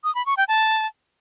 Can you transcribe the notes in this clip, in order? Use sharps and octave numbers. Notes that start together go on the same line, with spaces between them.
D#6
B5
C#6
G5
A5